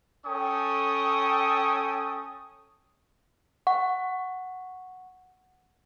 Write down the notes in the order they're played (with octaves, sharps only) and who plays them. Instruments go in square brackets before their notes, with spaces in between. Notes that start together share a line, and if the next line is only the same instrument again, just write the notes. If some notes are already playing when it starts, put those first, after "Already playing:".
[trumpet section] C#4 A4 G5 C#6 D#6
[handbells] F#5 C#6